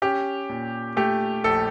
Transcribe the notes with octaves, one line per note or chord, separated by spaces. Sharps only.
C#4 G4
A#2
A3 G4
A#1 A4